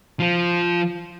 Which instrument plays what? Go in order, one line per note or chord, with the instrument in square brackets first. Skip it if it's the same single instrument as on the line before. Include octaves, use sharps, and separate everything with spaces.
[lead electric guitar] F3 F4